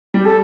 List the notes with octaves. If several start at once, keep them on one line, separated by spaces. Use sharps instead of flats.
G3 G4
A4